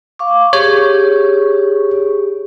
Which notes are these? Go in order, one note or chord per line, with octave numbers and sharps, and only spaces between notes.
F5 C#6 D6
G4 G#4 C#5 C#6